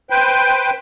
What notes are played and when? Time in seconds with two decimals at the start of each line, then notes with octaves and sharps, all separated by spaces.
0.10 B4 C5 G5